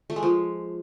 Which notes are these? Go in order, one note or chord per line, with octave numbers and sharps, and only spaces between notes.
A3
G#3
F3